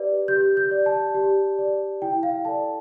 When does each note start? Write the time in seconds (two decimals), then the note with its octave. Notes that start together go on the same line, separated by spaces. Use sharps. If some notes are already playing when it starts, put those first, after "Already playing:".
Already playing: G4 B4 D5
0.28 G4 G6
0.57 G6
0.71 D5
0.86 A5
1.15 G4
1.59 D5
2.02 E4 G5
2.23 F5
2.45 A4 D5 A5